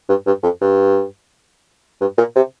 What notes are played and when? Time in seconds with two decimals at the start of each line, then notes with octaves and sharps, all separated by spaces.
0.09 G2
0.27 G2
0.43 F2
0.61 G2
2.01 G2
2.18 A#2
2.36 C3